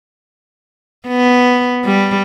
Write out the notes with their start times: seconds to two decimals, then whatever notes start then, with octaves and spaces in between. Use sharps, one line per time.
1.08 B3
1.85 G3